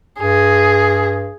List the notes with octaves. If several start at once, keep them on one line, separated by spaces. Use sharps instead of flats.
G2 G#4